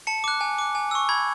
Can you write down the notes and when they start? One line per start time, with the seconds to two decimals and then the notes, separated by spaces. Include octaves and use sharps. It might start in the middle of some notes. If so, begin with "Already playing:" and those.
0.07 A5 C#7
0.24 D6 F#6
0.41 G#5
0.58 D6 F#6
0.75 G#5
0.91 C#6 E6
1.09 B5 G#6